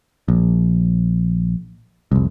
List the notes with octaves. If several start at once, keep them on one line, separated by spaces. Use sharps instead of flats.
A#1
F1 C2